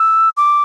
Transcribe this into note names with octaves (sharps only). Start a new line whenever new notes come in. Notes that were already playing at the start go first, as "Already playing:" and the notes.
Already playing: E6
D6